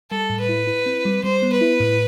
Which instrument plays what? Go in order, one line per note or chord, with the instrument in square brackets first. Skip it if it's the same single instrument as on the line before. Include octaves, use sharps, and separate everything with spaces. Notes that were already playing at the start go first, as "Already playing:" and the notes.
[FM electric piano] G3 [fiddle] A4
[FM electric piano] A2
[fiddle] B4
[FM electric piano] E4
E4
C4
G3
[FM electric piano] G3 [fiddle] C5
[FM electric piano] B3
[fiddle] B4
[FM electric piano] E4
A2